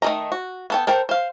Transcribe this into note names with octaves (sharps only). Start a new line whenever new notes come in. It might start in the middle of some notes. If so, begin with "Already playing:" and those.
D#3 A3 B4 D#5 A#5
F#4
B3 A4 G5
A4 A#4 C5 G5
C5 F5